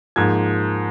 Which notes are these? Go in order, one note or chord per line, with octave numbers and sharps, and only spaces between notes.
G#2 F3 A#3 G#6